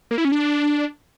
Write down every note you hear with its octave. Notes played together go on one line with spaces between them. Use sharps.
A#3
E4
C#4
D4